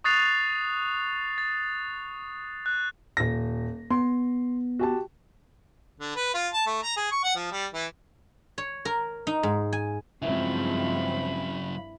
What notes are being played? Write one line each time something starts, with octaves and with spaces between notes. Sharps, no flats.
C#6 D#6 F#6 A6 C7 F7
A6
F#6
D#1 A#6
B3 C6
F#4 G4 A5
D3
B4
F4
A5
A3
A#5
G#4
C#6
F#5
F3
G3
E3
C#5
A#4
D#4
G#2
G#5
G2 C#3 F3 F#3 G#3 C4 E4 B5